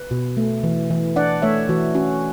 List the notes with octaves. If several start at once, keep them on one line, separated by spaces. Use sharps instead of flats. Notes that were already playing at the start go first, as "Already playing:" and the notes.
Already playing: B4
B2
A3
E3
E3
D4 D5 F#5
A3 C#5 E5
E3 F#4
C#4 F#4